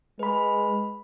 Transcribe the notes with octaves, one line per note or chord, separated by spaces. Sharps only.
G#3 B4 B5